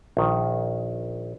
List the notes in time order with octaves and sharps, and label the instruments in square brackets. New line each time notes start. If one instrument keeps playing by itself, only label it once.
[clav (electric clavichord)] A#1 D#3